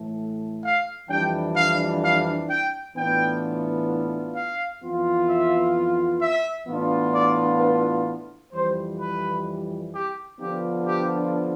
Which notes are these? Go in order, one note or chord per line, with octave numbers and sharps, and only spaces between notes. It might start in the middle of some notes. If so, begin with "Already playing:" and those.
Already playing: A2 E3 A3
F5
F2 E3 G3 D4 G5
F5
F5
G5
A2 E3 B3 D4 F4 G5
F5
F2 E3 B3 F4
E5
E5
A2 E3 B3 D4 F4
D5
B4
F2 E3 G3 C5
B4
G4
D3 F3 B3 D4 F4 G4
G4